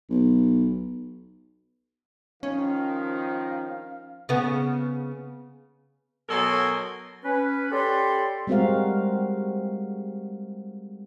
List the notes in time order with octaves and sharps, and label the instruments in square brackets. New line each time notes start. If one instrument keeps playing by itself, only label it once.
[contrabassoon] B1
[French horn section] D#3 F3 [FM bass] C#4 [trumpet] F5
[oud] C#3 B3
[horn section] B2 F#3 A4 A#4 G#5 C6
[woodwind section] C#4 B4
G4 A4 C#5 D5 B5 C6
[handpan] G3 G#3 C4 F#4 A#4 F5